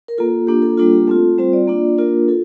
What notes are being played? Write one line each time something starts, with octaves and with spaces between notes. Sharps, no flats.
A#4
A#3 F4 A4
A#3 D4 F4 G4
A4
G3 A#3 D4 F4 A4
G4
A3 C4 F4 A4
G3 C4 F4 C5
D5
A#3 D4 F4
A#3 D4 F4 A#4
F4 A4